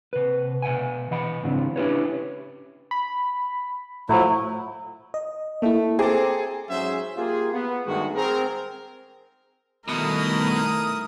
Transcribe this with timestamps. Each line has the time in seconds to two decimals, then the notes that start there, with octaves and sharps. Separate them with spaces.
0.13 C3 B4
0.62 B2 E5 F#5 G#5
1.11 E3 D#5 F#5 B5
1.43 G#2 C#3 E3 C4 D4
1.76 C#4 D4 E4 G4 B4 C#5
2.91 B5
4.09 A2 F3 F#3 E4
5.14 D#5
5.62 A3 A#3 E4
5.99 C4 G#4 A4 A#5 D6
6.70 G#2 F#3 C#4 G#4 C5 E5
7.17 A#3 F4 G4 G#4
7.52 B3
7.87 G2 D#3 G#3 A3 F#4
8.15 C4 G#4 A#4
9.88 B2 D#3 G3 A3 E4 A#4 D#6